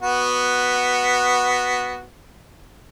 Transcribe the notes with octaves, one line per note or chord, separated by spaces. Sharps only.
B3 F#4